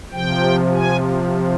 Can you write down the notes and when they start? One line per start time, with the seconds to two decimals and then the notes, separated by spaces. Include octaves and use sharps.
0.12 C3 F3 G5
0.74 G#5